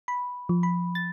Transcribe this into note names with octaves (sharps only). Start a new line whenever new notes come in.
B5
F3
B5
A6